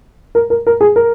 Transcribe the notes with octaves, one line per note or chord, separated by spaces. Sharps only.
A#4
A#4
A#4
G#4
A#4